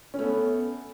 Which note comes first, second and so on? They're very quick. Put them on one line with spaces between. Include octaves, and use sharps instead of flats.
C#4 A3 B3